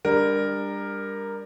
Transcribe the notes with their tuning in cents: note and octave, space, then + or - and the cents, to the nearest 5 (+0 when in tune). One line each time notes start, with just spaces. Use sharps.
G3 +30 D4 +0 A#4 +0